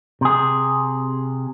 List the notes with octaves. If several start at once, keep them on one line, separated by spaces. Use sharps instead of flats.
C3 G#4